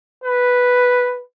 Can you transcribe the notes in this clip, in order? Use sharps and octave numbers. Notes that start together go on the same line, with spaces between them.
B4